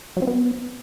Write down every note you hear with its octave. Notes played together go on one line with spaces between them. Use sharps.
F#3
C4
B3